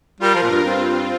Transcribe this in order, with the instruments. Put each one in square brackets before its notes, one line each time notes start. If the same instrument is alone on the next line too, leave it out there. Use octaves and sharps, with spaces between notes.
[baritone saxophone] G3 [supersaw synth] F4 A#4
[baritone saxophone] F3
A#2
G2
[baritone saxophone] G2 [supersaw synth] C4 F4